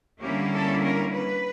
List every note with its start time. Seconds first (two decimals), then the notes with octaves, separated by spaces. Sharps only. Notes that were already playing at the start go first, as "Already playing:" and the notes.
0.21 D3 G3 A#3 C#4 E4 G4
0.52 A4
0.83 A#4
1.14 B4